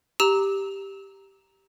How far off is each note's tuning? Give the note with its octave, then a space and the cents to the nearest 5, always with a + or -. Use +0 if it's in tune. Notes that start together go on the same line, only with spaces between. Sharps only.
G4 +0 A#5 +0 E6 -30